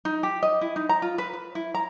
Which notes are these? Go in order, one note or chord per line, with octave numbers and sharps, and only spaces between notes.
D#4
G4
D#5
E4
D#4
A#5
F4
B4
B4
E4
A#5